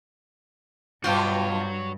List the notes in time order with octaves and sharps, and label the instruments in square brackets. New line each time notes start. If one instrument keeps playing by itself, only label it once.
[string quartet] G2 [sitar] B2 F4 [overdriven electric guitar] F#4 C#5 [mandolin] C5 G5 D6